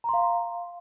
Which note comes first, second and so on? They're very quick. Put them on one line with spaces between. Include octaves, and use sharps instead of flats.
A#5 C6 F5